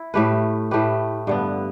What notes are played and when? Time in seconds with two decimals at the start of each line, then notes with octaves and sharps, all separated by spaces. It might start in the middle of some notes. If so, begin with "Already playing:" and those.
Already playing: E4
0.14 A2 A3 G4 B4
0.71 A2 A3 G4 B4
1.27 G2 D3 B3